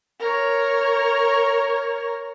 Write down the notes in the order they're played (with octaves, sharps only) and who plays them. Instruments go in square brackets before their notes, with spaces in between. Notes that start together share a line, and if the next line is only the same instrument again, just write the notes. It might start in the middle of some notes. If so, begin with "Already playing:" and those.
[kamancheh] A#4 C#5